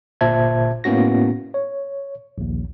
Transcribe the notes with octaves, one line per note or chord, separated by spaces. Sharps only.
G1 A#2 C5 E5 A5 G#6
A2 A#3 B3 C#4 F#4 A#6
C#5
A#1 D#2